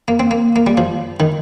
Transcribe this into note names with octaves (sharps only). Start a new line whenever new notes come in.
A#3
C4
A#3
A#3
G3
F3
D#3